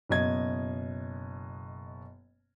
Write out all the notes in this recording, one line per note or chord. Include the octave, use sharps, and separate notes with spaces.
F#1 B2 D#5 G#6